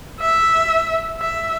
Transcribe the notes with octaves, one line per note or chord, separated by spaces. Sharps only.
E5
E5